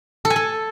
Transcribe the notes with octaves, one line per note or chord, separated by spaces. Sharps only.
A4
G#5
A4